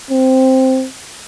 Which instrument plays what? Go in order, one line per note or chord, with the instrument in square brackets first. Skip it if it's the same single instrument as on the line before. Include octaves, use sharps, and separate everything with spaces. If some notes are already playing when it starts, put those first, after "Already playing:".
[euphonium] C4